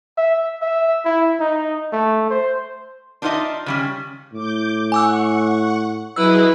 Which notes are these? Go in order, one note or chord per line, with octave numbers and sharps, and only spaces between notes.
E5
E5
E4
D#4
A3
C5
D4 D#4 F4 A4 D#5 E5
C#3 G3 C#4
A2 D6 G6
F#5 G#5 C#6 D6 E6
F#3 E4 G#4 B4 D#5 E6